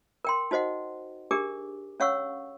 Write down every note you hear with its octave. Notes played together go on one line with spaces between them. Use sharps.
A#4 G5 C6
D#4 F#4 C5 D#5 F#5
D4 G4 G#4 A#4 D6
C#4 C#5 F5 F#5 C#6 E6